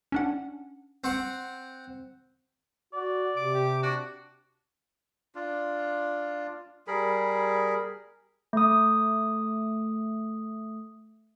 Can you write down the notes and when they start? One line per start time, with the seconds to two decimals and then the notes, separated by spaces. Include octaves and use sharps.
0.12 C#4 D4 F#5
1.04 C4 F#5
2.93 F#4 D5
3.37 C3 D6
3.55 G4
3.83 D4 F#4
5.35 D4 F4
6.87 G3 G#4 A#4 B5
8.53 A3 D#6